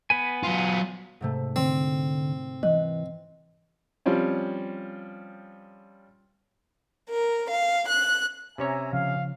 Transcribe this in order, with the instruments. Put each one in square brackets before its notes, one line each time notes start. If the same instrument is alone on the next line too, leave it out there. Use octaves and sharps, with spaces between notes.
[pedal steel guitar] B3 B4 G#5
[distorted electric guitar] F#3 F4
[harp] G#2 C3 A3
[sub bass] D3 [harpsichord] C4
[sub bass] E3 [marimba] D#5 [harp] F#6
[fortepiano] F3 G3 C4 C#4
[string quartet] A#4
F5
F#6
[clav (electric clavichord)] C3 C#4 C#5 [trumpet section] E5 G#5 A#5
[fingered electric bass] C#3 F3 [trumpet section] F5